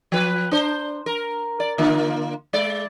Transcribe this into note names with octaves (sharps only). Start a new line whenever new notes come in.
F3 B4
D4 C5
A#4
D5
D3 A#3 F4
G#3 D5